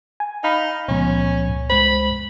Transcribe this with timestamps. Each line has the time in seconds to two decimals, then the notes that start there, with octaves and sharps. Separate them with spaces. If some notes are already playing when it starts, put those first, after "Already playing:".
0.20 G#5
0.44 D#4 F5 B5
0.88 C#2 A#2 F3 B3 C#4
1.70 G#3 C5 B5